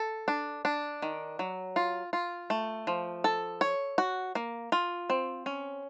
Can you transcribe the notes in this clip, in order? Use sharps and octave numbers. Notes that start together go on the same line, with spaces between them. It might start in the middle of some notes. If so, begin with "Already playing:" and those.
Already playing: A4
D4
D4
D#3
F#3
F4
F4
A3
F3
A4
C#5
F#4
A#3
F4
C4
C#4